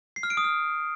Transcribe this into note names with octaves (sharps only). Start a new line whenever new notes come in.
C7
F6
D7
D#6
F6